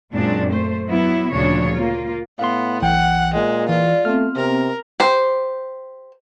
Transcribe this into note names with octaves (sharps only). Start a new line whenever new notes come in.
F#2 A#2 G#3 C4 D4
A3 C5
F#3 B3 E4
D2 A#2 C#3 F3 D4 C#5
A#3 F4
A2 B3 F5 C6
B1 E3 F#5 G5
A#2 G#3
E3 F4 D5
A3 B3 C4 F6
C3 A#4
G4 C5